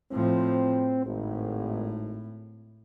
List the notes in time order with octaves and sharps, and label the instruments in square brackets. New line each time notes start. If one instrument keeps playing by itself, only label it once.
[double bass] A2 F3 [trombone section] C4
[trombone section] G#1 [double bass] A2